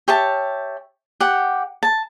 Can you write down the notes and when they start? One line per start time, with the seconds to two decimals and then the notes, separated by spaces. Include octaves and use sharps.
0.08 G4 C#5 E5 A5
1.20 G4 F#5
1.83 A5